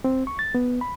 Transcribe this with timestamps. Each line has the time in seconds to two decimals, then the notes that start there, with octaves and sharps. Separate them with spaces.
0.04 C4
0.27 C#6
0.39 A6
0.55 B3
0.81 B5